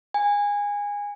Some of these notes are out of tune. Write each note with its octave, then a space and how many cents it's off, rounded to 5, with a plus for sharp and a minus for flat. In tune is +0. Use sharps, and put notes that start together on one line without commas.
G#5 -20